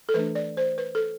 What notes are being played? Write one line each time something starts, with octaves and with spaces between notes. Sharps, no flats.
A4
E3 A3 D4 B4
D5
C5
B4
A4